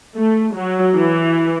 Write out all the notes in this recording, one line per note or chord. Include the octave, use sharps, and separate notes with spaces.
A3
F#3
E3